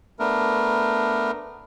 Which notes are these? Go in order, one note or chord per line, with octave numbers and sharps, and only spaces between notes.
A3 B3 D4 A#4